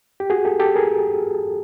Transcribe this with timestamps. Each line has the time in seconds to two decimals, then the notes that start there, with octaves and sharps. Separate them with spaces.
0.20 G4
0.30 F#4 G#4
0.45 G4 A4
0.60 G4 A4
0.75 G#4 A#4